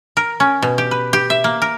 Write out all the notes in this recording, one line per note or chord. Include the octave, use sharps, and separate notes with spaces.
A#4
C#4
B2
G4
B4
G4
E5
A#3
A#4